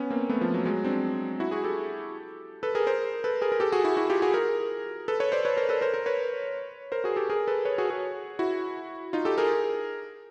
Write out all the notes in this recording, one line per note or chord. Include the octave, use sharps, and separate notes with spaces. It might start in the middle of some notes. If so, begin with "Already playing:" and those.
Already playing: B3 C#4
A#3 C4
A3 B3
F3
F#3
F#3 G#3
C4 D4
E4 F#4
F#4 G#4
G4 A4
A4 B4
G#4 A#4
A#4 C5
A4 B4
G#4 A#4
A#4
G4 A4
F#4 G#4
E4 F#4
E4 F#4
F4 G4
F#4 G#4
G#4 A#4
A4 B4
B4 C#5
C5 D5
B4 C#5
A#4 C5
A4 B4
A#4 C5
A#4 C5
B4 C#5
A#4 C5
F#4 G#4
G4 A4
G#4 A#4
A4 B4
B4 C#5
F#4 G#4
F#4 G#4
E4 F#4
D#4 F4
G4 A4
G#4 A#4